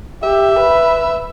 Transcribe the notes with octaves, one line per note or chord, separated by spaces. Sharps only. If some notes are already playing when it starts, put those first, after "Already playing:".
G4 E5
B4